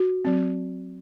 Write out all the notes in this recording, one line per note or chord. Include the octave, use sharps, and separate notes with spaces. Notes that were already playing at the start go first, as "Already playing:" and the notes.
Already playing: F#4
F#3 C4